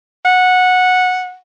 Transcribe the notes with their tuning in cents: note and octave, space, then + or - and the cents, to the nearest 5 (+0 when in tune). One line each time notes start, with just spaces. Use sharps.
F#5 -15